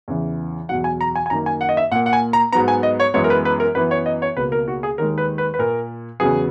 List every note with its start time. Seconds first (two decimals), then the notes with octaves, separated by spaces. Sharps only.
0.08 E2 C#3 E3
0.69 E2 B2 F#3 F#5
0.84 G#5
1.01 A#5
1.16 G#5
1.26 G#5
1.30 F#2 D#3 A#3 A#5
1.46 G#5
1.61 F#5
1.69 D#5
1.77 E5
1.91 A#2 F#5
1.95 A#3
2.06 F#5
2.13 G#5
2.33 A#5
2.52 G#2 F#3 B3 A#5
2.68 G#5
2.83 D#5
3.00 C#5
3.14 F#2 E3 G#3 B3 C#5
3.24 A#4
3.30 B4
3.45 B4
3.60 A#4
3.75 F#2 E3 B3 B4
3.91 C#5
4.06 D#5
4.22 C#5
4.37 C#2 B2 A#3 B4
4.52 A#4
4.68 F#4
4.83 G#4
4.98 D#2 D#3 G#3 A#4
5.18 B4
5.38 B4
5.54 B4
5.59 A#2 A#3 A#4
6.20 E2 C#3 F#3 B3 G#4